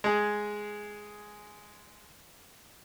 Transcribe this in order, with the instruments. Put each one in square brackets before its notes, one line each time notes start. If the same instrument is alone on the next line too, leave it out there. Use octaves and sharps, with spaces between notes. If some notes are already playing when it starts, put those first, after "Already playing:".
[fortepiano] G#3 G#4